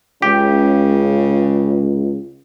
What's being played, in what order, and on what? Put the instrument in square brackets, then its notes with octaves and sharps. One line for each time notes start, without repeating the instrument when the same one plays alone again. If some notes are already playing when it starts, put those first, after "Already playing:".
[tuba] C#2 [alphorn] C#3 [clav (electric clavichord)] G4